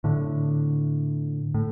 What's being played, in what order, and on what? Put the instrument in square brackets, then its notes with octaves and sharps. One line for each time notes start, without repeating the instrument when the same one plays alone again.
[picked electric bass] A2 D3
A2